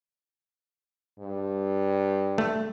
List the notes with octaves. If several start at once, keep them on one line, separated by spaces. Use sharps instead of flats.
G2
A3